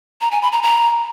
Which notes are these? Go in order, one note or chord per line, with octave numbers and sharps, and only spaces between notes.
A#5
G#5
B5
A#5
A#5